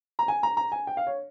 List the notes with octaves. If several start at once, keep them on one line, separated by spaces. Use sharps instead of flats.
A#5
G#5
A#5
A#5
G#5
G5
F5
C#5